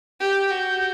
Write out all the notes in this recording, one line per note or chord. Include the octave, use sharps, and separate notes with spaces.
G4 G6
F#4